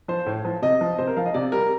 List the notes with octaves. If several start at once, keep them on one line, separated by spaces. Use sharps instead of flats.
F3 C5
A2
F3
C3 D#5
F3
C3 C5
A#4
F3 F5
D#5
C3 D5
G3 A#4